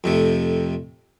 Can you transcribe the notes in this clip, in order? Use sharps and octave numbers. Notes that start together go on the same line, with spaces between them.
F2 C3 A3